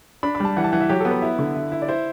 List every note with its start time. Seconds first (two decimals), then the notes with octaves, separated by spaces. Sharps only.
0.23 D4 B5
0.35 B5
0.40 G3 A5
0.57 E3 F#5
0.64 A5
0.73 E3 F#5
0.81 E5
0.89 F#3 G4
1.00 A4
1.05 B3
1.11 B4
1.22 E4
1.39 D3
1.55 E4
1.72 E4
1.82 D5
1.88 E4 C5